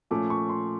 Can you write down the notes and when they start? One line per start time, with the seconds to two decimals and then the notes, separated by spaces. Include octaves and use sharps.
0.11 A#2 F3 A3 C#4 D6
0.30 C#6
0.49 C6